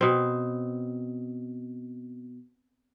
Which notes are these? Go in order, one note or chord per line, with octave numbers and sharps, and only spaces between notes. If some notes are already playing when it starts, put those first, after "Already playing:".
B2 C4